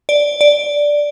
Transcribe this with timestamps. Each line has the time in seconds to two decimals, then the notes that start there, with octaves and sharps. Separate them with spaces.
0.09 D5
0.41 D5